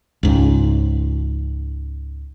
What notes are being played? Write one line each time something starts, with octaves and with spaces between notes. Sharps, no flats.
C#2 G#2